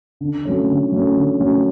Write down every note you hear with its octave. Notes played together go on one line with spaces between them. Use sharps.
D3
F#3 A3 C#4
D3
F#3 A3 C#4
D3
F#3 A3 C#4